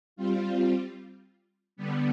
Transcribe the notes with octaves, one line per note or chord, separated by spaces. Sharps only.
G3 C4 F4
D3 G3 B3